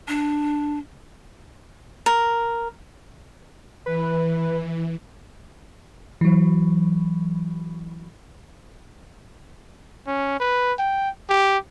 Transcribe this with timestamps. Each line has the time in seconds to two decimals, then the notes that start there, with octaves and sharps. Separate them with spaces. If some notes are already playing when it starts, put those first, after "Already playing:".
0.08 D4
2.06 A#4
3.86 E3 B4
6.21 E3 F#3
10.07 C#4
10.40 B4
10.79 G5
11.29 G4